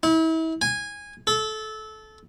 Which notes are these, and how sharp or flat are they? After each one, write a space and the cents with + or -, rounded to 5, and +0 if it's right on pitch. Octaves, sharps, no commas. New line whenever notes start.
E4 -35
G#5 -15
A4 -20